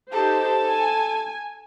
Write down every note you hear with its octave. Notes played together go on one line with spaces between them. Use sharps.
D#4 G4 A4 C5 A5
G#5